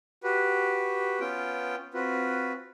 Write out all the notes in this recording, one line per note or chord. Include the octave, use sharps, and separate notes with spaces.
F#4 G4 B4
B3 C#4 F4 G5
C4 F4 F#4 B4